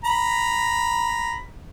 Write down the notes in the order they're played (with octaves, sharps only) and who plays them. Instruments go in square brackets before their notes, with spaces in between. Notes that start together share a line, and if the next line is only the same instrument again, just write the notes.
[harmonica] A#5 B5